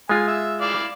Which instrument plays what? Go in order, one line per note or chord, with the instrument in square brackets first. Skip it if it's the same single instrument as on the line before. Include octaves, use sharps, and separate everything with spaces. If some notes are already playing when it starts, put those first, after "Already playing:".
[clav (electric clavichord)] G#3 F4 [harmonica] G#5
[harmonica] E5
E4 D5 F5